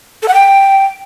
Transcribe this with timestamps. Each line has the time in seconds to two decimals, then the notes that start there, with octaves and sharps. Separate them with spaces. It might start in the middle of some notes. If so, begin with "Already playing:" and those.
0.22 A4
0.28 F#5
0.34 G5